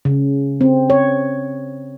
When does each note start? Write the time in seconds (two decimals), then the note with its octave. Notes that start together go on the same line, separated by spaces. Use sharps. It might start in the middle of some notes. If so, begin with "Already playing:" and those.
0.05 C#3
0.61 C4
0.90 C#5